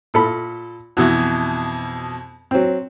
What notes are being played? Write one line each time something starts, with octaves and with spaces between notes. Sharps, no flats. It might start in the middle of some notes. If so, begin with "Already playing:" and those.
A#2 A4 B5
F2 B2 E3 F#4
F#3 C4